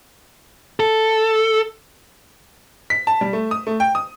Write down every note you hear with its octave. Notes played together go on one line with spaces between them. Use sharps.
A4
B6
A5
G3
A3
D#6
A3
G5
D#6